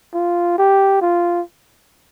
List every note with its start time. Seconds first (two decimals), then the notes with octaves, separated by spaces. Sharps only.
0.14 F4
0.58 G4
1.02 F4